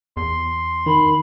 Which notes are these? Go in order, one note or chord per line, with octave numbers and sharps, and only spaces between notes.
E2 C6
D#3 B5